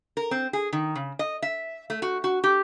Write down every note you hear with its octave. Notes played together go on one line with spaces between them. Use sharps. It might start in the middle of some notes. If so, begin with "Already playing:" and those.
A#4
C4
G#4
D#3
C#3
D#5
E5
A3
F#4
F#4
G4